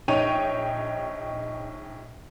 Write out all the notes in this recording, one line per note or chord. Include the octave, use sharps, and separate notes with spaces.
A#1 D#4 C#5 G5 D#7 F7